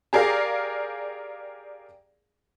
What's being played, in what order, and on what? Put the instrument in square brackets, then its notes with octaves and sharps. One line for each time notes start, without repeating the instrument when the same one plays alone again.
[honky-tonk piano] G4 G#4 A#4 D5 F5